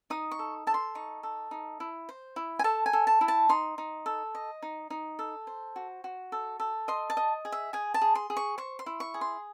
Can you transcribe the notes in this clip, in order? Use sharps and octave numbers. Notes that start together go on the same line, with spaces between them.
D#4 D#6
C#6
A4
A4 A5
C6
D#4 C#6
A4
D#4
E4
C5
E4
G#5
A4 A5
G#5
A4
A5
E4
A5
D#4 C6
D#4
A4
D#5
D#4
D#4
A4
C5
F#4
F#4
A4
A4
D#5 C6
A5
D#5
G#4
E5
G#4 G#5
A5
G#4
C6
G#4
C#6
C5 C#6
C6
E4
C#6
G#4
C6